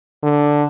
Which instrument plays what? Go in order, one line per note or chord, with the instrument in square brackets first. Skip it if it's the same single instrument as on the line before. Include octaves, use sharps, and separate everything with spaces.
[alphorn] D3